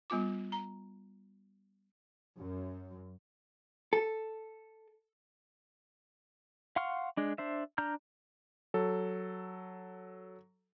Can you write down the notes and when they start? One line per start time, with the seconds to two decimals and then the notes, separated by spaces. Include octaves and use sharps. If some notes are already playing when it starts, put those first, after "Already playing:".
0.10 G3 B3 F4 D6
0.52 A#5
2.38 F#2
3.93 A4
6.76 F5 F#5 C6 C#6 F6
7.17 G#3 D4
7.38 D4 C5 E5
7.78 D4 A#5 F6 G6
8.74 F#3 A4